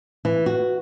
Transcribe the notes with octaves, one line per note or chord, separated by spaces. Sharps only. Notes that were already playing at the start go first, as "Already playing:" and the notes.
E3
F#4